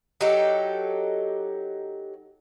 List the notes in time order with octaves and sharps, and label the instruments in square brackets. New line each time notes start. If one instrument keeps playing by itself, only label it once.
[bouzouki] F#3 D#4 G4 A4